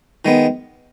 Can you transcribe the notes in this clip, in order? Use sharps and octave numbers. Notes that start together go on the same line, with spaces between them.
D#3 G#3 B3